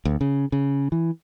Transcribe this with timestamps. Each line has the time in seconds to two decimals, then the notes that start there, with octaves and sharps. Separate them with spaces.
0.05 D2
0.21 C#3
0.52 C#3
0.92 E3